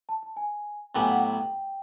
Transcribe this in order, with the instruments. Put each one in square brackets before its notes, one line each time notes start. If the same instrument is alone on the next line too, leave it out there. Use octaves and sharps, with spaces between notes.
[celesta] A5
A5
G#5
[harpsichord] A2 F#3 B3 E4 G4 [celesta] G#5
[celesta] G5
F#5
G5